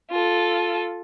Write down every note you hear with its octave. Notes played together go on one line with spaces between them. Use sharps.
F4 A4